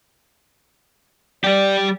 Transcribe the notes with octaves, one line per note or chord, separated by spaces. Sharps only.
G3 G4 D5